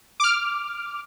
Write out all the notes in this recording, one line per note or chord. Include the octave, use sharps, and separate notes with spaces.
D6 F6